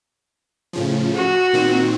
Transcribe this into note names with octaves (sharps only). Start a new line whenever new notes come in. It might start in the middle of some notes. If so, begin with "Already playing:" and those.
A2 C#3 F3
F#4
A#2 D#3 C4